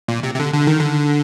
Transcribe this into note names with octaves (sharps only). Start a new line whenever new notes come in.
A#2
C3
C3
D3
D3
D#3
D3